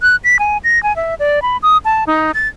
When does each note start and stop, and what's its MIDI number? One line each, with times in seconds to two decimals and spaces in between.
0.02 0.16 90
0.24 0.37 95
0.39 0.58 80
0.64 0.82 94
0.83 0.95 80
0.96 1.15 76
1.19 1.42 74
1.42 1.57 83
1.63 1.78 87
1.85 2.04 81
2.07 2.31 63
2.34 2.48 93